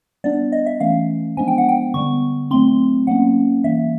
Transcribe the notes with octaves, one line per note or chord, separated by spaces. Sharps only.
G3 B3 D4 D5
D#5
E5
E3 A3 C#4 F5
F3 G#3 B3 D4 G#5
G5
F#5
G5
D3 G3 B3 C#6
F#3 A3 C4 C6
F#3 A#3 C#4 F#5
E3 G3 A#3 E5